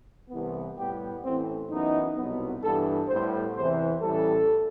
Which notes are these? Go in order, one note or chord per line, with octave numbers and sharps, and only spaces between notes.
C2 C3 E3 B3
A2 G3 B3 G4
A1 A2 E3 A3 C4
F#2 E3 B3 D#4
C2 B2 F#3 B3
G2 E3 B3 A4
A2 G3 B3 C5
E2 C3 E3 C5
A1 A2 E3 G3 A4